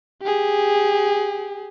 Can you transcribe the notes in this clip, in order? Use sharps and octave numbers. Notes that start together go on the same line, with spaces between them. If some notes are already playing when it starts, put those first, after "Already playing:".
G4 G#4